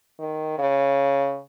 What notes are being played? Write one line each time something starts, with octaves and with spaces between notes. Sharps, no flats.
D#3
C#3